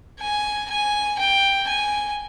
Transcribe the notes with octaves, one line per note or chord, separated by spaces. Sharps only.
G#5
G#5
G5
G#5